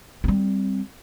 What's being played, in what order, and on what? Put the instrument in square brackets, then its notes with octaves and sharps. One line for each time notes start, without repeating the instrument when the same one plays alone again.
[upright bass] G3 C4